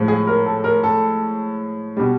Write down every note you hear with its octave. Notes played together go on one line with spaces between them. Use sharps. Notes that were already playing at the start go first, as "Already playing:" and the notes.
Already playing: A2 F3 G#3
G#4
A#4
A4
A#4
A4
B2 G3